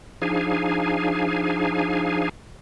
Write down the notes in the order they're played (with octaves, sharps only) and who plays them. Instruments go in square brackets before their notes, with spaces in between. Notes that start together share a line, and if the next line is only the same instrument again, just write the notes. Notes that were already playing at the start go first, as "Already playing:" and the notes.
[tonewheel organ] F3 D4 D#4 G#4 F5 G#5